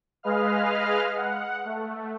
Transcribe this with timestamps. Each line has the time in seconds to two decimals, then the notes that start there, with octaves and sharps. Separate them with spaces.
0.23 G#3 G#4 B4 D#5 F5 F6
1.16 F#5
1.65 A3